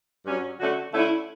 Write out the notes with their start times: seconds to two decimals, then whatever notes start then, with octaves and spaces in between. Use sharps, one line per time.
0.26 G2 F#3 C#4
0.59 D3 A3 C#4 F#4
0.93 D3 A3 C#4 E4